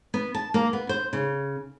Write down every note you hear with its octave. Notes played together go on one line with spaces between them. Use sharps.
B3
A5
A#3
B3
C5
C#3